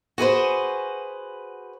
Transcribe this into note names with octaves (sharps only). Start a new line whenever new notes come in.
F#4 G#4 B4 C5